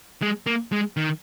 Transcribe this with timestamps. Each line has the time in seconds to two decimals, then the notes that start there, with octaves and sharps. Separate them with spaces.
0.22 G#3
0.47 A#3
0.72 G#3
0.97 D#3